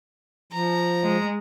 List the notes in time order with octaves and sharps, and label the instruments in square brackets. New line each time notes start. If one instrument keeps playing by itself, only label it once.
[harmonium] F3 [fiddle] A#5
[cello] G#3